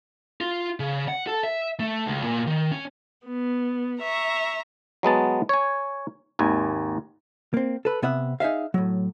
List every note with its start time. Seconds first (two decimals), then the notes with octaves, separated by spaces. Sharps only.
0.41 F4
0.80 C#3
1.08 F#5
1.27 A4
1.43 E5
1.80 A3
2.06 C#2
2.23 A#2
2.46 D#3
2.71 C#4
3.26 B3
4.01 E5 A#5 C#6
5.03 F#3 G#3 B3 A5
5.49 C#5 G#5
6.39 G#1 D#2 G#5
7.54 A#3 C4
7.85 A4 B4
8.02 C3 B3 E5 F#5
8.40 D#4 G#4 E5 F5
8.74 A2 F#3